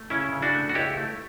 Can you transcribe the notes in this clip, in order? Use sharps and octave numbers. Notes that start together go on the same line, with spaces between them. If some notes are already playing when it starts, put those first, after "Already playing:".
Already playing: A3
C#3 C#4 E4
C#3
D4 F#4
A3
F#4
C#2 E4 G4
A3